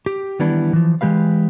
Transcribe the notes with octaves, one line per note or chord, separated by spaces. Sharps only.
G4
D#3 E3 G3 B3 D4 E4
E3 F3
E3 G#3 G4 B4 F5